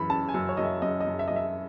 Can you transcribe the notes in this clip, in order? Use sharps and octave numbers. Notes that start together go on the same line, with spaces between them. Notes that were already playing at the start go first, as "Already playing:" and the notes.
Already playing: F#2 E3 B5
C#4 A5
G#5
F#2
C#5
F#2 D#5
E5
F#2 D#5
D#5
F#2
E5
F#2 D#5
E5